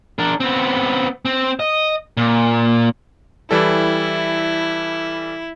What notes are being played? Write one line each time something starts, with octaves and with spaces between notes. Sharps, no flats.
D4 A#4
B3 C4
C4
D#5
A#2
E3 G3 E4 A4